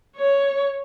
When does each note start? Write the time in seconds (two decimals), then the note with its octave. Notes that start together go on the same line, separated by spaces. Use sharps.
0.16 C#5